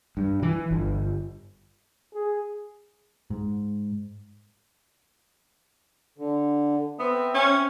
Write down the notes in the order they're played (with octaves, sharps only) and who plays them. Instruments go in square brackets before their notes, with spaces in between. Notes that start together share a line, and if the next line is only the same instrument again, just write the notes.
[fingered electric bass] G2
E3
G1
[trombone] G#4
[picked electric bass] G#2
[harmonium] D3
[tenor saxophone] B3 [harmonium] C4 E5
[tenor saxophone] C#4